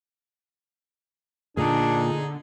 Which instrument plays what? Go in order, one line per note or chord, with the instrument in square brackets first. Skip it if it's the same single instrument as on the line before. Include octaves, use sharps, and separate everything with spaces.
[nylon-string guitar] A#2 [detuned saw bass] D3 [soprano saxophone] D4 [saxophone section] D#4 G#4